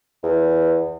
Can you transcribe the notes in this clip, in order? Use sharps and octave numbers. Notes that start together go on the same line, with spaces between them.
E2